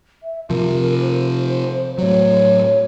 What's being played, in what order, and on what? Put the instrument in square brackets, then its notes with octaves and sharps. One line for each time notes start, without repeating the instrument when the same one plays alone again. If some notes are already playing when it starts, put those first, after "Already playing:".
[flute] E5
[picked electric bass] C3 F3 [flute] A#4
[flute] C5
[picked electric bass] A2 F#3 [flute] C#5